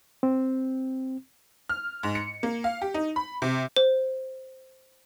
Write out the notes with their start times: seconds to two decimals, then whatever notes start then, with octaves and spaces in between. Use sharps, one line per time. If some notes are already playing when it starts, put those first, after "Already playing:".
0.23 C4
1.69 F6
2.03 G#2
2.15 C#7
2.43 A#3
2.64 F5
2.82 G4
2.94 D#4
3.16 B5
3.42 C3
3.76 C5